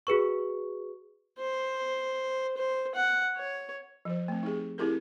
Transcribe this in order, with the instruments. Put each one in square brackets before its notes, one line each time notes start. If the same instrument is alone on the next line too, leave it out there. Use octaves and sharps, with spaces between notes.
[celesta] F#4 G#4 B4 C#6
[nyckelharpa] C5
C5
F#5
C#5
[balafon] F3 C5
A3 C4
D#4 G4 G#4
C4 E4 G4 G#4 A#4